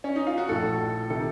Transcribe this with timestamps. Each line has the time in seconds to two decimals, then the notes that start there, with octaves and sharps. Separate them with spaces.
0.04 C#4
0.16 D#4
0.27 F4
0.38 F#4
0.48 A#1 A2 A4
1.10 C3 D#3 A4